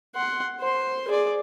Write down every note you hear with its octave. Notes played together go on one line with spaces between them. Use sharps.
F#5 C6
C5 C6
G#4 D5